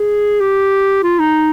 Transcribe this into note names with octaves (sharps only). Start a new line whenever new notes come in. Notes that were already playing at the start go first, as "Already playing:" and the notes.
Already playing: G#4
G4
F4
D#4